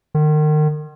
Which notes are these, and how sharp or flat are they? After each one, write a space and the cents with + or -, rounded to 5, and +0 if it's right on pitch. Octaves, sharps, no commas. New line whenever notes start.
D#3 -35